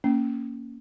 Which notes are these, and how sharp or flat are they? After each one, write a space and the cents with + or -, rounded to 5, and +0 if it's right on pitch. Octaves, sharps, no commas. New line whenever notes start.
A#3 +0 C#4 +5